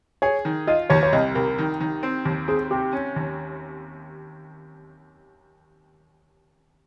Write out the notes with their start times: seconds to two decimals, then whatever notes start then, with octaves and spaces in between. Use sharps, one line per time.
0.22 G#4 C#5
0.45 D#3
0.67 F4 D#5
0.90 D#2 C#5
1.03 C#5
1.13 C2 D#5
1.35 C2 A#4
1.58 D#3
1.80 D#3
2.03 C4
2.25 D#2
2.48 C4 G#4
2.71 C3 G4
2.93 C#4
3.16 D#2